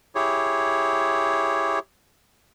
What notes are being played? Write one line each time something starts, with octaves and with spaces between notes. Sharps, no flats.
E4 G4 G#4 C#5